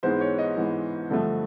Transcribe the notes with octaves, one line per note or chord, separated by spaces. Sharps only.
G#2 E3 G#3 B3 C5
C#5
D#5
G#2 E3 G#3 B3
G2 D3 F3 A3